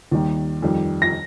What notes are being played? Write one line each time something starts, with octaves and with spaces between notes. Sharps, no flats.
D#2 D#3 G3
F2 D#3 G3
A#6